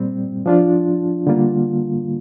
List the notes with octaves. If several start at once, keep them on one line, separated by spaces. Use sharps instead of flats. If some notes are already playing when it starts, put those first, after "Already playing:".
Already playing: A#2 G3 C4
F3 D4 F4
D3 G3 A#3 F4